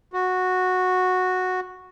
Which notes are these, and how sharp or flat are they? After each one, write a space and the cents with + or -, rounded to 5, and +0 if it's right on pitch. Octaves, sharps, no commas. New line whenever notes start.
F#4 -10